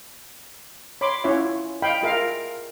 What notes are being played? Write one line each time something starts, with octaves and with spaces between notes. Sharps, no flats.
C#5 B5 C6 D6
C#4 E4 F4 C#5 E5
D#5 F5 G5 B5
F4 G#4 A#4 E5 F5